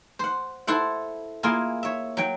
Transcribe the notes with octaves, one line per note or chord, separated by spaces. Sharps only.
C5 F#5
E4 A4 C5 F#5
A#3 E4 F4 G#4
C#5 E5
F#3 G5